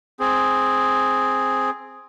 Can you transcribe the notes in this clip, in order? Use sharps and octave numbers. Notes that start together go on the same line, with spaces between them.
C4 G#4